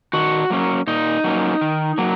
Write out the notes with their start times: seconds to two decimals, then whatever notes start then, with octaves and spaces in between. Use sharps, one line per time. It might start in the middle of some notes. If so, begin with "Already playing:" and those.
0.13 D#3 F#4
0.50 F#3 A#3 C#4
0.87 A#2 D#4
1.24 F#3 A#3 C#4
1.61 D#3
1.98 F#3 A#3